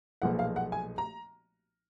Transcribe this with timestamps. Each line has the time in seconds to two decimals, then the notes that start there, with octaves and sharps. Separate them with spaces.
0.22 B1 A#2 F3 G#3 F#5
0.39 F5
0.56 F#5
0.72 G#5
0.98 A#5